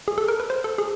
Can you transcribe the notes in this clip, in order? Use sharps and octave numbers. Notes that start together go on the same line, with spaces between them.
G#4
A4
A#4
B4
C5
A4
G#4